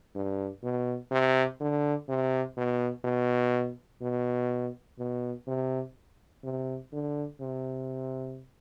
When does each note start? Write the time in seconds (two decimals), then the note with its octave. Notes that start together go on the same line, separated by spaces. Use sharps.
0.15 G2
0.63 B2
1.11 C3
1.60 D3
2.09 C3
2.57 B2
3.05 B2
4.01 B2
4.99 B2
5.47 C3
6.44 C3
6.92 D3
7.40 C3